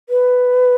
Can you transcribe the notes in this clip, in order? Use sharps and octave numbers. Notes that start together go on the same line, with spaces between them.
B4